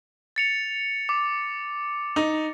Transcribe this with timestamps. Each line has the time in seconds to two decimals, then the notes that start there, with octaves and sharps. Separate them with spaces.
0.36 A6 C#7 F7
1.09 D6
2.16 D#4